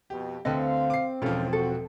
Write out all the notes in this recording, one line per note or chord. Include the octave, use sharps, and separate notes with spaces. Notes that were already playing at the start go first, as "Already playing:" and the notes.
F2 B2 G4
D2 D3 C4 A4 B4 D#5 F5
D6 C7
E1 G#2 E3 F3 C#4 F4 A4
F#4 A4